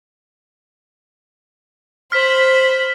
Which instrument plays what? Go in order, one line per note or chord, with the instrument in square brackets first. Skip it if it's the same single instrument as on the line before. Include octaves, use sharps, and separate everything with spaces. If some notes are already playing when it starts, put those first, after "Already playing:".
[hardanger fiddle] C5 B5 [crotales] F6 B6